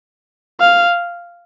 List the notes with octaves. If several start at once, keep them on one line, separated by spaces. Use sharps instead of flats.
F5